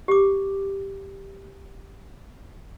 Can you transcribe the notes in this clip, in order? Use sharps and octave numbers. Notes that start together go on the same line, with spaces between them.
G4 D6